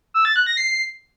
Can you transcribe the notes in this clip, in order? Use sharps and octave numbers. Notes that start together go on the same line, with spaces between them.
E6
A6
F#6
A#6
C7